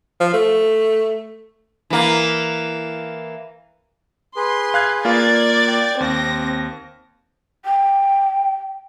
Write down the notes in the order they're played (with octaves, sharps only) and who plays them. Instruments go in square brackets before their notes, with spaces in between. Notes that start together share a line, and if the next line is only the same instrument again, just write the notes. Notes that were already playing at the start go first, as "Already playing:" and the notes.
[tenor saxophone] F3
A3
[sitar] E3 A#3
[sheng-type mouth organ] G#4 B4 [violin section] C6
[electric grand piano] F5 F#6 G#6
[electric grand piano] A#3 F4 [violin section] D5 G#6 A6
[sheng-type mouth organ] G5
[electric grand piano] D#2 [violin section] C4 A#6 [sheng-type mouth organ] D6
[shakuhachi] G5